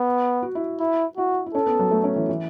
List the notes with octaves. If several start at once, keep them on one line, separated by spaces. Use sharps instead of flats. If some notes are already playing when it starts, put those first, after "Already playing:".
Already playing: B3
F#4
E4
E4
E4 F#4
E4
C#4 A4
B3
F#3
A3
C#4
E3
E3